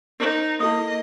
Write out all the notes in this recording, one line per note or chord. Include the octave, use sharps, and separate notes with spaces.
D#4 A#4 C5
A#3 E4 A4 D#5 D#6